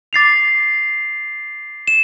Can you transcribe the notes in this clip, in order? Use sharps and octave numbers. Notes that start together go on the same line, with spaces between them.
D6 A6 C7 F7
E7